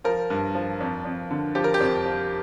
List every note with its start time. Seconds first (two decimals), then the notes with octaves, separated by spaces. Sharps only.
0.04 F3 A#4
0.30 G2
0.55 F3
0.80 F2
1.05 F2
1.31 D3
1.55 F3 G4
1.64 A#4
1.74 G4
1.80 F2
2.05 F3